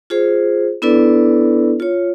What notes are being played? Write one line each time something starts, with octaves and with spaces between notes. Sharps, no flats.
F4 G#4 C5
B3 D4 E4 A4 B4 D5
F4 C#5